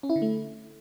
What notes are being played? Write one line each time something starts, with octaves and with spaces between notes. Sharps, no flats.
C#4
E4
D3
A3